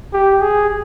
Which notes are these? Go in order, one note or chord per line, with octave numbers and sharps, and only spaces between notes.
G4
G#4